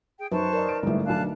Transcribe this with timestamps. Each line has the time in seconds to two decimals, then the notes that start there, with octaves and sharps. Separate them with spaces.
0.19 G#4 G5
0.32 F#2 D#4 B4 C5 A5 C#6
0.53 A#4 D5 D#5
0.69 D7
0.83 G1 C2 G#2 D3 A3
1.06 B1 D4 E5 F5 A5 F#6